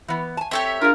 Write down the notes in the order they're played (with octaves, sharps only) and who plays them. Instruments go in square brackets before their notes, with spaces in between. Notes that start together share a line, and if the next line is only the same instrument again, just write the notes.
[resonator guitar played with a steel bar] E3 B3
G#5 A5
[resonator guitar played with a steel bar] C4 A4 [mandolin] G4 C#5 E5
[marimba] D4 F5 [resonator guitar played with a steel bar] F4 G#4 [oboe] A#4